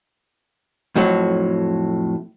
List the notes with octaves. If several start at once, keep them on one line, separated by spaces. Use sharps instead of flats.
F2 A2 F#3